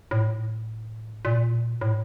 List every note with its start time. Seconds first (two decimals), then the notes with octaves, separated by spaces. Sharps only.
0.11 A2
1.25 A#2
1.81 A2